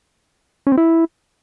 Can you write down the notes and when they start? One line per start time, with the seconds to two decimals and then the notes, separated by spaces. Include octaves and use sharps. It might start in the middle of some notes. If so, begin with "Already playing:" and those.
0.67 C#4
0.72 C4
0.77 E4